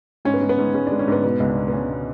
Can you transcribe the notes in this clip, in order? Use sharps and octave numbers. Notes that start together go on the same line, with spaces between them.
G#2 C#4
B3
G#2
B3
G#2
G#3 C#4
D4
G#3
C#4
G#2 B3
B2 B3
C#2
D4
B2
B3
C#2 C#4
B2